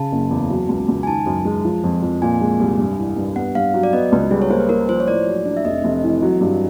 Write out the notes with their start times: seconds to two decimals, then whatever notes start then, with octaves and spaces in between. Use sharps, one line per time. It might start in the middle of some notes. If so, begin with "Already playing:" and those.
Already playing: C#3 A5
0.12 F#1
0.31 E2
0.50 F#3
0.69 C#2
0.88 C#2
1.03 G#5
1.07 D#3 A5
1.26 F#2
1.45 G#3
1.65 F3
1.84 F2
2.02 F2
2.22 A#2 G#5
2.41 G#3
2.60 C2
2.79 G2
2.98 E3
3.17 G2
3.36 B3 F#5
3.55 G2 F5
3.74 F#3
3.83 D5
3.93 B3 D#5
4.12 C#2 B4
4.31 G3 G#4
4.42 C#5
4.50 A#3 C5
4.60 B4
4.69 A#3 A#4
4.89 F3 C5
5.00 C#5
5.08 A2 D5
5.26 F#3
5.45 D4
5.57 E5
5.65 F1 D#5
5.84 F1
6.03 E3
6.22 F#3
6.41 G2